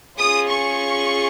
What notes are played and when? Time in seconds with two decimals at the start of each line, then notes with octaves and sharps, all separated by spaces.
0.17 C#4 F4 G#4 D#6
0.48 C#6